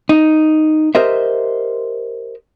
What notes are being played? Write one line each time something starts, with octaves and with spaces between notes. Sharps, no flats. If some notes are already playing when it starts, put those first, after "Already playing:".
D#4
G4 A#4 C5 D#5 E5